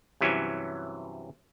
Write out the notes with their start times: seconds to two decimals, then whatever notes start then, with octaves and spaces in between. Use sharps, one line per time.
0.21 G2 C3 E3 F#3 C#4 G#5